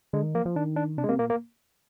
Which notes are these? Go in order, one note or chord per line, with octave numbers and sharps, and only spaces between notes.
D3 G#3
D#3
F3 A#3
F3
D#3 D4
D4
C3 D4
G#3
C3 A#3
A#2 A#3
A#3